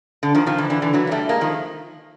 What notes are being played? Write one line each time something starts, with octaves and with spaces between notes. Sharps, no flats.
D3
D#3 F3
D#3 F3
D3 E3
D3 E3
D3 E3
E3 F#3
A#3
G3 A3
G#3 A#3
D#3 F3